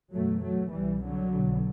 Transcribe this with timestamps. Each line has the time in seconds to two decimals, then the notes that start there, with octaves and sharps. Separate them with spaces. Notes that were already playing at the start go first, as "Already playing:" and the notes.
0.12 F#1 E2 B2 F#3 A3
0.42 F#3 A3
0.72 C2 B2 E3 G3
1.02 D3 F#3
1.32 B1 B2